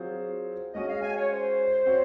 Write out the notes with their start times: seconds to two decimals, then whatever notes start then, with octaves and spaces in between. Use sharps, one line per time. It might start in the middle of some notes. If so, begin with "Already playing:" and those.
Already playing: F#3 C4 F4 G#4 C5
0.74 G#3 C#4 F#4 D#5
0.88 F5
1.02 G#5
1.16 C#5
1.30 C5
1.86 C4 F#4 C#5